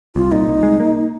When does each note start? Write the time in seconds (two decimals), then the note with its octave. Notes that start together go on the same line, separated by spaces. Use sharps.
0.15 C2 F4
0.32 A#2 D#4
0.48 C2
0.63 G#3
0.80 A#3